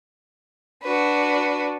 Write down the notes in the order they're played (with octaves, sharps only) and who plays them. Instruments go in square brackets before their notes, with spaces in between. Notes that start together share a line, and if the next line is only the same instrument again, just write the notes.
[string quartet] D4 F#4 B4